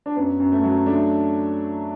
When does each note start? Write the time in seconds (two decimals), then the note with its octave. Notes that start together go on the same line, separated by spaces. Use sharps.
0.06 D4
0.16 F#2 B3
0.40 F#2
0.52 A3
0.64 F#3
0.87 A3 D4